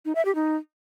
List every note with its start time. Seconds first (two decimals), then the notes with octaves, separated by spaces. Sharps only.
0.05 D#4
0.15 E5
0.25 G4
0.35 D#4